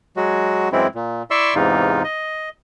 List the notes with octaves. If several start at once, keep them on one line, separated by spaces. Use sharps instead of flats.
F#3 G#3 F#4
F#2 E3 G#3 C4 E4
A#2
E4 D5 E5 C6 C#6 E6
E2 G#2 C3 E3 D#4 F4
D#5